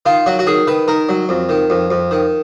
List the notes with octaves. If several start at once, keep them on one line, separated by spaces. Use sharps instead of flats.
D#3 F4
F#3 F#4
F#4
D#3 G#4
D#3 B4
D#3 A#4
F#3
F2
D#3
F2
F2
D#3